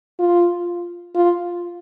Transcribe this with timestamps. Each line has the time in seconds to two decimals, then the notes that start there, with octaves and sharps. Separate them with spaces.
0.19 F4
1.15 F4